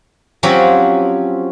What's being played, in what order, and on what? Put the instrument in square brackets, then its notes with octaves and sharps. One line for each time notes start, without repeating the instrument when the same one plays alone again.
[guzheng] F3 F#3 C4 C#4 F#4 G4